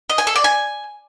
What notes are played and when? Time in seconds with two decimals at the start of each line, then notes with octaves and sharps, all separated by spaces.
0.10 D#5
0.18 G#5
0.27 A4
0.36 D5
0.44 G#5